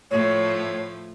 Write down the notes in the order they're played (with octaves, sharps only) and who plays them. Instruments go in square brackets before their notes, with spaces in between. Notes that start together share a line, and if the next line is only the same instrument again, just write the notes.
[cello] A2 [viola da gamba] F3 A3 [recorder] C#5